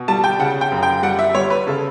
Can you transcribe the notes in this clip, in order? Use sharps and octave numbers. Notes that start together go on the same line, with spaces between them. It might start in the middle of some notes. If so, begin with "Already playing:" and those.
Already playing: B2
G3 A5
G5
C#3 F#5
G5
F#2
G5
G3 F#5
E5
G3 C#5
B4
C#3 A4